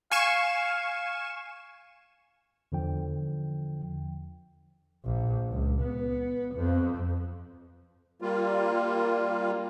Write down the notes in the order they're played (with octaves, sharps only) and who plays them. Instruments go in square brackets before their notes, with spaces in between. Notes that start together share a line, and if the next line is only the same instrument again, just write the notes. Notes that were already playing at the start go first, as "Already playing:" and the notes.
[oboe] F5 [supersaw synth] G#5 C#6 E7
[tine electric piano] E2 D3 F3 G5
[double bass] A#1
C#2
B3
F2
[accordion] G3 A#3 F4